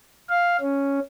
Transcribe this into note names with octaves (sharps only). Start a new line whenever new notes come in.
F5
C#4